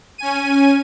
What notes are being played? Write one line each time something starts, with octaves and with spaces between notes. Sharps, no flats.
C#4 G#5 D#7